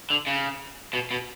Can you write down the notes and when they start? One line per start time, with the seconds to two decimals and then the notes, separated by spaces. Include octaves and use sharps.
0.10 D3
0.27 C#3
0.93 B2
1.11 B2